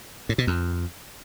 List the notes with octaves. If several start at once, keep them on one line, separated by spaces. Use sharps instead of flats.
A2
B2
F2